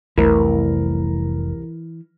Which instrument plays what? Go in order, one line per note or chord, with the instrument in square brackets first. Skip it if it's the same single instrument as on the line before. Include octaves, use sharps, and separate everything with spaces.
[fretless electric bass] F1 A3 [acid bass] C2 [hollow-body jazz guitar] E3 [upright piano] A#4